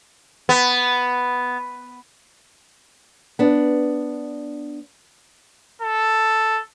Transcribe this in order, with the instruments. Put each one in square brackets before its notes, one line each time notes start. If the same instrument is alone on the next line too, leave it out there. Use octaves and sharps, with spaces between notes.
[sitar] B3
[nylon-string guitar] B3 D4
[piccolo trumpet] A4